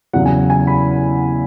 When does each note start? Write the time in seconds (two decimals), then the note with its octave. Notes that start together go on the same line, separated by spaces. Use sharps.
0.13 E2 C#3 F#3 F#5
0.26 G#5
0.50 G#5
0.67 B5